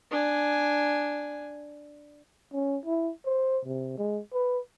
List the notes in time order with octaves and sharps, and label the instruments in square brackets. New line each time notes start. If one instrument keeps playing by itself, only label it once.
[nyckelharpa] D4 G#5
[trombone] C#4
E4
C5
C3
G#3
B4